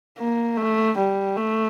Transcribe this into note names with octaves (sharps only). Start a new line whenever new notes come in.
A#3
A3
G3
A3